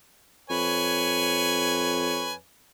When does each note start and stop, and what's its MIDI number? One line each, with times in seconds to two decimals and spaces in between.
0.50 2.38 41
0.50 2.33 71
0.50 2.33 73
0.50 2.33 80